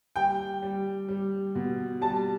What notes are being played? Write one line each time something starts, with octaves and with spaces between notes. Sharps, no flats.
G3 G5
G3
G3
B2
G3 A5